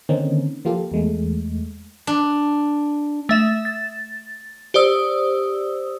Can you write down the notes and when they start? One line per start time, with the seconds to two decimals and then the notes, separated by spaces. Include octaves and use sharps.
0.09 D3 D#3 A#3 C4 C#4 D#4
0.65 F3 A#3 F4 G4 A4
0.92 E2 G#3 A3
2.07 D4
3.29 A3 E5 E7
3.65 A6
4.74 G4 C5 D5 D#6 E6